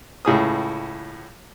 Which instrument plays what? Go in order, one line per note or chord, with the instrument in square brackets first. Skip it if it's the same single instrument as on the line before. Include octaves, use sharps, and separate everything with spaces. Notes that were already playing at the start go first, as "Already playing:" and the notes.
[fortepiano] C#2 A2 G#4 D#6